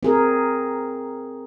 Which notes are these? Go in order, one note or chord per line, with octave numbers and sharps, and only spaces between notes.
C4 G#4 A#4